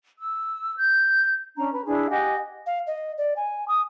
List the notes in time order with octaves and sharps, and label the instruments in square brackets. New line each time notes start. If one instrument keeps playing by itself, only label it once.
[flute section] E6
G6
C#4 D4 A#5
B4
D4 E4 G#4
G4 D#5 F#5 G#5
[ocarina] F5
D#5
D5
G#5
D#6